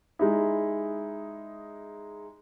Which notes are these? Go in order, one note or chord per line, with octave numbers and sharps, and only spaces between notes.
G#3 D#4 E4